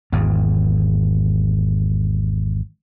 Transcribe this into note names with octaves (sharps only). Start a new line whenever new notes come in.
G#1 E2